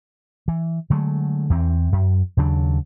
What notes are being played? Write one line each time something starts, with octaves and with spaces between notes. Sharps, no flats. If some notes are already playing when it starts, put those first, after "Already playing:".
E3
D3 F#3 G#3 A3
E2 E3 C4
F#2
D#2 C#3 F#3 D4